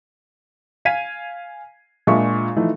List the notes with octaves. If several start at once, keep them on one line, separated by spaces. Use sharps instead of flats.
F5 G#5 G#6 B6 D#7
A#2 G#3 D4 F4 E5 C#6
E3 F3 A3 D#4